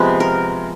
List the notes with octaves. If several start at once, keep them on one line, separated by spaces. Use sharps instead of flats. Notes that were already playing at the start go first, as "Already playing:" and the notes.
Already playing: C3 F3 G#3 B3 B4
A#4